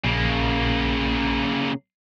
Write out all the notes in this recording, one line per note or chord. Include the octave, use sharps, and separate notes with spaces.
A#1 C#3 A#3